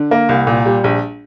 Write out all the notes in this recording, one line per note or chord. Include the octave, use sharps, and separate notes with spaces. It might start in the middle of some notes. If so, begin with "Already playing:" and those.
Already playing: D3
A#3
C2
A#2
G3
A#1